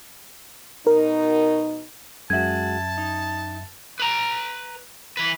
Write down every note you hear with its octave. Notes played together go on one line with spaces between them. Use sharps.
B2 D#4 A#4
F#2 G#3 F#4 E5 A5 G#6
D#4
B4 A#5
E3 B4